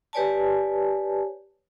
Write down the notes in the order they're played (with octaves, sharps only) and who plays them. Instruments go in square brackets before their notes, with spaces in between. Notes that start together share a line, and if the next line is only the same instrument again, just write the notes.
[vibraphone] G4 B4 C#5 D5 G#5 A5